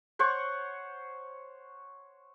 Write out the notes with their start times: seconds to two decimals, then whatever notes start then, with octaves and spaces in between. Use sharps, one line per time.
0.19 C5 C#5 F#5 C#6